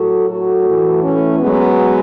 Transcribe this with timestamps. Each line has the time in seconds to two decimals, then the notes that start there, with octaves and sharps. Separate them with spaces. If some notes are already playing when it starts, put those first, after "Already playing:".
Already playing: A2 F#3 F#4 A4
0.29 F#4 A4
0.67 A2 E3
1.03 A3 C#4
1.40 B2 F#3 G#3 B3